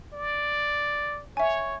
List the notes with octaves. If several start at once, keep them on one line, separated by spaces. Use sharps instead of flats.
D5
C#5 E5 G#5